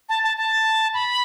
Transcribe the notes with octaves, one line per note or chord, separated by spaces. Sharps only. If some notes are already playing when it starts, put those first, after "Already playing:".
A5
A5
A5
B5